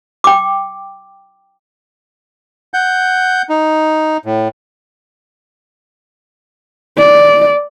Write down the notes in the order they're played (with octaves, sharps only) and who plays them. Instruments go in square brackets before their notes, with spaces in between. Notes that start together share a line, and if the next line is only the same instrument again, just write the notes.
[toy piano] G5 D6
[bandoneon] F#5 G6
D#4
A2
[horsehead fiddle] D5